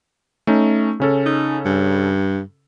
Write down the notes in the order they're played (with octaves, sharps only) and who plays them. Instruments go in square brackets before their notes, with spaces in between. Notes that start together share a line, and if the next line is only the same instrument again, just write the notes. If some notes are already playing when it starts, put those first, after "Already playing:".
[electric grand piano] A3 C#4 D#4
C#3 C#4 A4
[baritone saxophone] D#4
G2